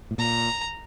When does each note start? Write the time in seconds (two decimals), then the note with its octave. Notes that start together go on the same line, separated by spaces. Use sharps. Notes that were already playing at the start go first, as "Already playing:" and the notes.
0.11 A2
0.18 A#2 A#5